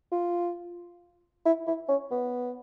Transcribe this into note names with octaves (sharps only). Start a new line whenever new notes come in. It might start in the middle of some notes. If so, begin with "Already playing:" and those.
F4
E4
E4
C#4
B3